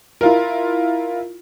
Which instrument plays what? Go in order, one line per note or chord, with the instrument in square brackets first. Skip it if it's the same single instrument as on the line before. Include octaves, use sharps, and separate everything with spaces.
[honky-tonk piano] E4 F4 A#4